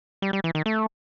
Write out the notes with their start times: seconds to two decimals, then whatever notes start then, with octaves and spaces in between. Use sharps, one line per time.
0.22 G3
0.33 G3
0.44 E3
0.55 D#3
0.66 A3